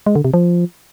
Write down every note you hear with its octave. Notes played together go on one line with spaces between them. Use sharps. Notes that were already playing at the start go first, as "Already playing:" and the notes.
G#3
D3
C3
F3